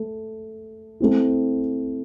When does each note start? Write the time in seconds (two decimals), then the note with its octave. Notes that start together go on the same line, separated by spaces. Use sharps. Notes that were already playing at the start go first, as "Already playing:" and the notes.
Already playing: A3
1.00 A3 C4 E4